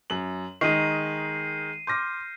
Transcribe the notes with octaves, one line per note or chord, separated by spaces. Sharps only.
F#2 F#7
D#3 G#3 D#4 C7 D#7
C6 D6 F6 G6 A#6